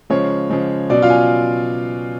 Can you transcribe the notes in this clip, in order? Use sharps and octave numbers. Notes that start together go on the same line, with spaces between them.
C#3 F3 G#3 C#5
C#3 F3 G#3
B2 F#3 C#4 D5
F4 F5
G#5